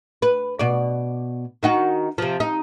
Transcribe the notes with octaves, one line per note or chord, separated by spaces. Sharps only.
B4
B2 D5
D#3 D#4 F#4
C3 F3
D#4